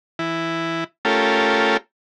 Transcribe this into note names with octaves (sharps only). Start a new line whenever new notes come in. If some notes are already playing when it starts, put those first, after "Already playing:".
E3 E4
A3 C#4 F4 G4 A4 A#4